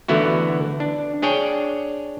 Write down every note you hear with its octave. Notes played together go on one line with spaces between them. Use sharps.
D3 E3 A3 B3 E4 F#4
D4
D4 G#4 C#5 G5